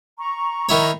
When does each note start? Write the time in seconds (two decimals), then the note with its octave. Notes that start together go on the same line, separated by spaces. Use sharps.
0.18 A#5 C#6
0.69 D#3 E4 C#5